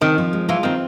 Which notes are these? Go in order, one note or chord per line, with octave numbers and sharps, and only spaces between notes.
D#3 C4
F3
G#3
E3 F4
D#3 C4